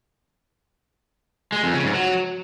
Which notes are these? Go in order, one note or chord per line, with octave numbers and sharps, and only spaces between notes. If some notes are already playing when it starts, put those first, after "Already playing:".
G#3
F2
C#3
G#2
F#3